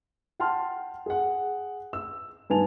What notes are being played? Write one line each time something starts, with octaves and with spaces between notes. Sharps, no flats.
F#5 G5 A5 C6 F6
G#4 F#5
E6
G2 D#3 B3 G#5 A5 F7